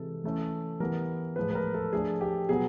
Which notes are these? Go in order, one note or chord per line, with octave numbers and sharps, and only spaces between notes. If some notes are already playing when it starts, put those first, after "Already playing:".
Already playing: C3 E3 G#3 A4
E3 A3 C#4
E3 G3 B3 A#4
A2 F3 G#3 B4
B4
A#4
A4
F3 A3 D4 G#4
G4
B2 F#3 B3 G#4